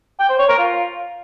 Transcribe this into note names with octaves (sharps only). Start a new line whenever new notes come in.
G5
C5
C#5
A#4
F4